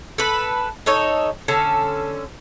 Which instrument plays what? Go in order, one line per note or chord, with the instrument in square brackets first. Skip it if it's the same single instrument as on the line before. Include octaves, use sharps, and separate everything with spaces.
[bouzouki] A4 B4
D#4 A4 C#5 D#5
D3 C#4 A4